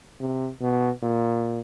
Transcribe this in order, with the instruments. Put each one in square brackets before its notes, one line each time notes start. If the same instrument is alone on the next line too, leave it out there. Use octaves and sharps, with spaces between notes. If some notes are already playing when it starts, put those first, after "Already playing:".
[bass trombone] C3
B2
A#2